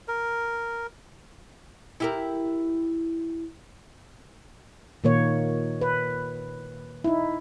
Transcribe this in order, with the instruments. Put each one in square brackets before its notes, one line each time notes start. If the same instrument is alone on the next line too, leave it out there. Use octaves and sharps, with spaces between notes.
[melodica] A#4
[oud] E4 G4 A#4
[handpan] A#2 D#3 A#3 C#5
B4
D#4 E4